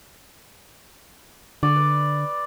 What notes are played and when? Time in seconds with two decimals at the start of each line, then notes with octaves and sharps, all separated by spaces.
1.63 D3 D5
1.76 B4